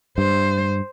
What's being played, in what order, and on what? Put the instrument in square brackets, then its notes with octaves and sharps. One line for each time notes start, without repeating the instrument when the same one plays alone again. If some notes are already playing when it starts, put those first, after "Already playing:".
[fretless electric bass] G2 [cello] C5